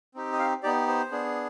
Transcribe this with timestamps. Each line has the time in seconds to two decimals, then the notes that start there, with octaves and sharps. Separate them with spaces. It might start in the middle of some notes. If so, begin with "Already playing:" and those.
0.15 C4 D#4 G4
0.32 D#5
0.39 F5
0.63 B3 D#4 G4 D5
0.87 C5
1.11 B3 D4 G#4